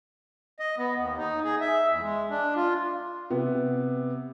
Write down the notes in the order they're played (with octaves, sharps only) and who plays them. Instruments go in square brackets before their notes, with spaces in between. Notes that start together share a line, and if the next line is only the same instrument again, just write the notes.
[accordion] D#5
B3
D#2
D#4
G#4
E5
E2
G#3
D4
F4
[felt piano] C3 B3